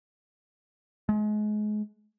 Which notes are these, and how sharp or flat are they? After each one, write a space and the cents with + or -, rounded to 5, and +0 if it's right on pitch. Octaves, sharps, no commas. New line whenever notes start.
G#3 +30